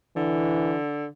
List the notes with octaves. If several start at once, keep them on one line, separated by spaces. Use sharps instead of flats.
D3 E3